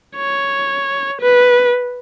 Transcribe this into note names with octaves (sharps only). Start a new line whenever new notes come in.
C#5
B4